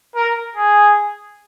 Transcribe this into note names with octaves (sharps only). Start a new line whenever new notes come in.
A#4
G#4